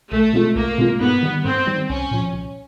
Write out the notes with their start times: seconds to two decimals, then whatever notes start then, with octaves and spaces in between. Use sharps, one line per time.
0.12 B1 A3
0.33 B2 G#3 C4 F4
0.55 B1 A#3
0.78 B2 G#3 C4 F4
1.00 G#2 B3
1.23 D#3 G3
1.44 G#2 C4
1.66 D#3 G3
1.89 C2 C#4
2.11 A#2 F3
2.34 C2